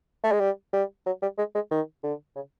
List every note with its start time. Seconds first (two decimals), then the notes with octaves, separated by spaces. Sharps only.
0.24 A3
0.32 G#3
0.40 G3
0.73 G3
1.06 F#3
1.22 G3
1.38 G#3
1.55 G#3
1.71 D#3
2.03 D3
2.36 C#3